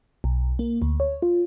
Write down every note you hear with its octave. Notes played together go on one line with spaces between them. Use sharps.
B1
A#3
D2
C#5
F4